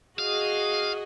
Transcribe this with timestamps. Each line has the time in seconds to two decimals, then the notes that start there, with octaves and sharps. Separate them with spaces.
0.19 F#4 G#4 D#5 F5